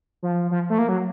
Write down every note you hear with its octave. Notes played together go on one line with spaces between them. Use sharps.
F3
F3
A3
A#3
F#3